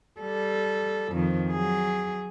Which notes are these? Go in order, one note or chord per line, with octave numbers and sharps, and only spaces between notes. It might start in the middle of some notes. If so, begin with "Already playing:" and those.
G3 A4
F2 D#3
F#3 G#4